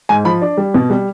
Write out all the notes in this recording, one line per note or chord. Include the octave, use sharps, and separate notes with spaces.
G#2 G#5
F3 B5
D4
G3
B2
G3